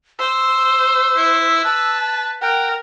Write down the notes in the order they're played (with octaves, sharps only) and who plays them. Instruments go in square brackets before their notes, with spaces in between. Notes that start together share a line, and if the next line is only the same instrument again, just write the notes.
[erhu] C5 [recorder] E6
[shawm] E4
[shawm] B4 [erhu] A5
[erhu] A#4 [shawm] F#5 [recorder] G5